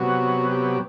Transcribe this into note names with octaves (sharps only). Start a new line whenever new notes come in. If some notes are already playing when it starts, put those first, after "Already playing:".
Already playing: C3 F#3 B3 F#4
G4